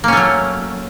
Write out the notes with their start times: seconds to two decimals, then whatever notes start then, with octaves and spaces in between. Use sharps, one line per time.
0.04 A#3
0.08 C#4
0.13 A3
0.17 F#3